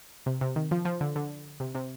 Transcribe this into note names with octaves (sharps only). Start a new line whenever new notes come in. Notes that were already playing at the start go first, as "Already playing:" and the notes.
C3
C3
D#3
F3
F3
D3
D3
C3
C3